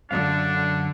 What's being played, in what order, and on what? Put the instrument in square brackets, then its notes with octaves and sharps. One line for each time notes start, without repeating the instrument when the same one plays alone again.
[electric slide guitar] F#2 F#3 F5 [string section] D3 [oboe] D4